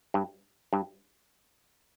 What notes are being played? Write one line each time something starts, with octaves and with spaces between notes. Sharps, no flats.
G2
G2